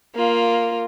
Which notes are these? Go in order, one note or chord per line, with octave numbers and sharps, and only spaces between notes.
A#3 F4